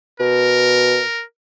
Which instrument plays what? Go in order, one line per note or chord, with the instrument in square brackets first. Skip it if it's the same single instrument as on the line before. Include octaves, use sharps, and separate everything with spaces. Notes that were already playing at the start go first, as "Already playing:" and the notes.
[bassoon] B2 [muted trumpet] A#4